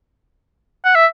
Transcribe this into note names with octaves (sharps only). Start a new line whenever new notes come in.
F#5
E5